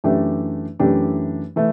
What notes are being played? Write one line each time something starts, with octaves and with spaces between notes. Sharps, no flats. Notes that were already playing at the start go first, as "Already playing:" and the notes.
F#2 E3 A3 D4 G4
F#2 E3 A3 D4 G4
E3 A3